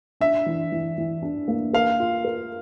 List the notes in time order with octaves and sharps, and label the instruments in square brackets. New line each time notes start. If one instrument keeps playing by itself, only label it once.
[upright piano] D4 [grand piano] E5
[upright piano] E3
E3
E3
D4
A#3
[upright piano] A#4 [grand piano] F5
[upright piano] F4
A#4